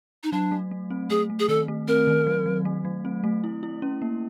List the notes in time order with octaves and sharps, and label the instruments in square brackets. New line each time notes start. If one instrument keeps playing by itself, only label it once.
[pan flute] D#4
[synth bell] F#3 [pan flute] D4
[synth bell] A3
A3
C4
[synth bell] A3 [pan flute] G#4
[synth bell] A3
[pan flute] G#4
[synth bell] D#3 [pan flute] A4
[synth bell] A3
[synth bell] C4 [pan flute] A#4
[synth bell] D#3
F#3
F#3
A3
F#3
C4
A3
E4
E4
C#4
A#3